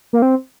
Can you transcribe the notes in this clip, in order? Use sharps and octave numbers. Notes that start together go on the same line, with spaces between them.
A#3
C4